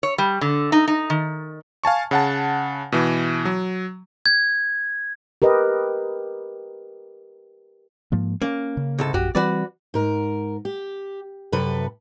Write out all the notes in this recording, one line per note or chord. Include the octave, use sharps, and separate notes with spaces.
C#5
G3
D3
D#4
D#4
D#3
F5 G#5 A5 C#6
C#3 F#5 A5
B2 E3
F#3
G#6
G4 A#4 B4 D#5
G#2 F3 A#3
A#3 C#4
C#3
C2 G#2 A4
A#1 F#2 F#4 G4
E3 G3 C4 F#4 B4 D5
G#2 A#4
G4
F#2 C3 A4 B4